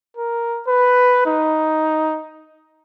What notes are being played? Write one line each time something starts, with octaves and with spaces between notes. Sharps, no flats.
A#4
B4
D#4